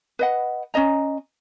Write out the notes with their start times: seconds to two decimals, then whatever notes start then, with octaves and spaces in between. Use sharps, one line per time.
0.19 B4 D#5 F#5
0.74 C#4 G#4 D#5 A#5